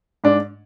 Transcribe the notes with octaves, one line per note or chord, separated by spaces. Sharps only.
G#2 D4